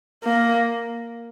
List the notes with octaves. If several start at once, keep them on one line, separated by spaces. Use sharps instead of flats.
A#3